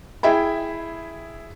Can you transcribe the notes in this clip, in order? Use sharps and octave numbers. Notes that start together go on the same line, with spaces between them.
E4 G#4 E5 G5 B5